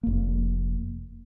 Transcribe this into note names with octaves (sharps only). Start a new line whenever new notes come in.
F1 A#3